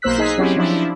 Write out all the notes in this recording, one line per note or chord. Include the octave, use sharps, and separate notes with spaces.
B1 A#3 C5 E6 F#6 B6
D#4 G#4 D#5 B6 C7
F#3 C4 C#4 E4 G4
F3 D4 E4